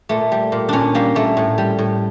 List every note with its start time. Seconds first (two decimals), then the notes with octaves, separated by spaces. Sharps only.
0.09 A#2 A3
0.32 G3
0.52 A#2
0.69 A#2 C#4 D4
0.95 G3 A#3
1.15 A#2 A3
1.37 A2
1.58 G3
1.79 A2